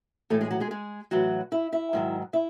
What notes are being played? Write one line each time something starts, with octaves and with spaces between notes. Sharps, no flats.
A2 E3 A3 A4
G#3 G#4
F#3 F#4
G#3 G#4
G#3 G#4
A2 E3 F#3 F#4
E4 E5
E4 E5
G#2 D#3 F#3
E4 E5